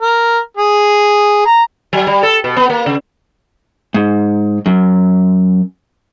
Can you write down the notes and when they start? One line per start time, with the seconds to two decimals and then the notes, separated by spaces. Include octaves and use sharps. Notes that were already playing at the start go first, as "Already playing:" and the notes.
0.01 A#4
0.57 G#4
1.46 A#5
1.93 F#3
2.07 G3
2.23 A4
2.44 B2
2.57 B3
2.70 A#3
2.86 C#3
3.94 G#2
4.66 F#2